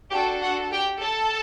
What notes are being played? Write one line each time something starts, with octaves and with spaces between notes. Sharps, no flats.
D4 F#4 G4 A4 G5
F#4 F#5
G4 G5
A4 A5